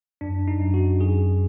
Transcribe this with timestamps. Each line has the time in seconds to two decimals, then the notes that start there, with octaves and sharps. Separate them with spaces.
0.21 F#2 D4
0.48 D#4
0.60 F#2
0.74 F#4
1.00 F#2 G#4